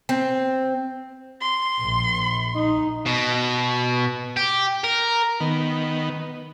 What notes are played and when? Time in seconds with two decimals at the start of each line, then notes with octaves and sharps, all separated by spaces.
0.09 C4
1.41 C6
1.79 A#1
2.55 D#4
3.06 B2
4.37 G4
4.84 A#4
5.40 D#3 B3